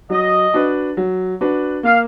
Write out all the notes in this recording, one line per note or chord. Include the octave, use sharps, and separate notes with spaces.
F#3 D#5
D4 F#4 B4
F#3
D4 F#4 B4
A#3 F5